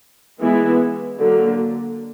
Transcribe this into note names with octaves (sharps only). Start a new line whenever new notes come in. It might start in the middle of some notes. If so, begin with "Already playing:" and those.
E3 G#3 B3 E4
D3 F#3 A#3